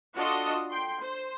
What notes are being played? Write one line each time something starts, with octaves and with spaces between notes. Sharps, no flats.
D4 F4 F#4 A4 D#5
G5 C6
C5